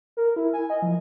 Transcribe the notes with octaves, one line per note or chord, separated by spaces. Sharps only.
A#4
E4
G#5
D#5
F3